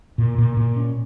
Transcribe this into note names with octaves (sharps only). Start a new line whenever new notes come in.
A#2
A#2
A#2
C#4